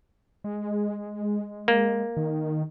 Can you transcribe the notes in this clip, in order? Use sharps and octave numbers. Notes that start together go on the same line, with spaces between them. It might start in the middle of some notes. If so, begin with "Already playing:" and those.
G#3
A#3
D#3